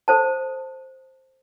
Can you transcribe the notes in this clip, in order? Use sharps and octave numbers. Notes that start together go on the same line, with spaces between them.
A4 C5 A5